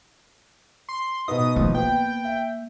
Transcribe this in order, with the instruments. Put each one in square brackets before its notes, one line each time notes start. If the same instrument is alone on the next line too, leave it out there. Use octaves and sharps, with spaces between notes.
[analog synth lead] C6
[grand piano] B2 B3 D#4 [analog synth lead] D#6
[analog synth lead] F3 [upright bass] A#3
[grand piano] B3 [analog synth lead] G5
[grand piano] E5